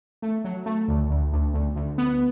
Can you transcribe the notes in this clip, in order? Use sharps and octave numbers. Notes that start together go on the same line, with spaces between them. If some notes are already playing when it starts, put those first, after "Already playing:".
A3
F#3
A3
D2
D2
D2
D2
D2
B3